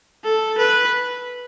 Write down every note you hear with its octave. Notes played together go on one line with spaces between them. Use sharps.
A4
B4